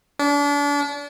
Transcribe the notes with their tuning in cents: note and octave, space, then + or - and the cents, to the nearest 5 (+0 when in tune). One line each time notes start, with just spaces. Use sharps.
D4 -35